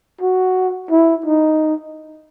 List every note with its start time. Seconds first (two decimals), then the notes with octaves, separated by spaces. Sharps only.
0.21 F#4
0.91 E4
1.26 D#4